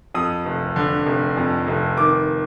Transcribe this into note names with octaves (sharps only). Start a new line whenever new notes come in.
F2 D#6
F1
D3
F1
F2
F1
D#3 D6